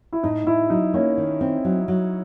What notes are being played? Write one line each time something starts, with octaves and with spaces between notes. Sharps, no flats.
E4
A2 D#4
A2 E4
F#3 D#4
A#3 C#4
D#3
C4
F#3
F#3